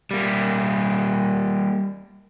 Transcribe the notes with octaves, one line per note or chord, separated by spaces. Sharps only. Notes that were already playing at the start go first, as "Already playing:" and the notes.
G3 A#3